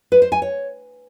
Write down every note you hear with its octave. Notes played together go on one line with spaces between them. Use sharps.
B4
C5
G#5
C#5